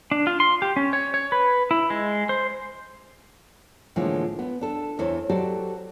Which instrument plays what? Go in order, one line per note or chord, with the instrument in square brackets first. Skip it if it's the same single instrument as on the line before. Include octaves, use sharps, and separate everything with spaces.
[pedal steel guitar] D4
F4
C6
G4
C#4
C#5
C#5
B4
E4
G#3
C5
[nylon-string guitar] A2 D3 E3 F3 G#3 A#3
B3
D4 A4
E2 E3 E4 A4 C5 C#5
F#3 F#4 G4 A4 C5 D5